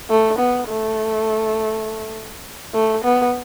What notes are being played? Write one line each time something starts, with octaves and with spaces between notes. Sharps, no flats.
A3
B3
A3
A3
B3